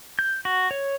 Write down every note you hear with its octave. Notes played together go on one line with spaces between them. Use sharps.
G6
F#4
C#5